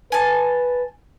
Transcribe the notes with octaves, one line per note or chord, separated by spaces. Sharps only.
B4 G#5 A5